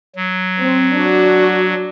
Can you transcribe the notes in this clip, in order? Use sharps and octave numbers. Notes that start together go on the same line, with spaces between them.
F#3
C4
D4 F#4